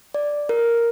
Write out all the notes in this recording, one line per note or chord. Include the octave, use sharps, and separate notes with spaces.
D5
A#4